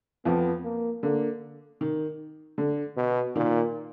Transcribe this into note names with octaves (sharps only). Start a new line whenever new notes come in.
F2 F3 B3
A#3
D3 A#3
D#3
D3
B2
A#2 D#3